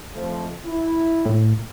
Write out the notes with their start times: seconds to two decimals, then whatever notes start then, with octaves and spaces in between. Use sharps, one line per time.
0.15 F2 F3 A3
0.66 E4
1.26 A2